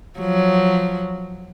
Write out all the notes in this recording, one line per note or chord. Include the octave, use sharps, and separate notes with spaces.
F3 F#3